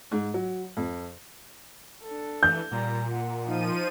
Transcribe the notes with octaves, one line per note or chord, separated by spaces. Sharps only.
G#2
F#3
F2
D4 A4
E3 G6
A#2 G3 A#5
F#5
F3 D#4 D#7